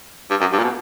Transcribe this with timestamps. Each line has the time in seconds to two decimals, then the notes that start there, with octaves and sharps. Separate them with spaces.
0.30 G2
0.40 F#2
0.52 G2
0.59 A#2
0.63 B2